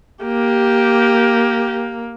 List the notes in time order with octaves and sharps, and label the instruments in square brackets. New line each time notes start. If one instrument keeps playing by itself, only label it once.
[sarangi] A#3 [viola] G4